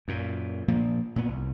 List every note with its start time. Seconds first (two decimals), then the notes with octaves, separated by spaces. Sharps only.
0.08 F#2 A#2
0.68 A#2 F3 A#3
1.16 A#2 B3
1.28 C2